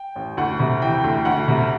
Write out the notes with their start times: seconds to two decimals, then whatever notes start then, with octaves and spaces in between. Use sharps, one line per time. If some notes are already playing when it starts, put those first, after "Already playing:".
Already playing: G5
0.16 A1
0.37 D2 F#5
0.60 C3
0.81 E3 G5
1.04 D2
1.25 D2 F#5
1.48 C3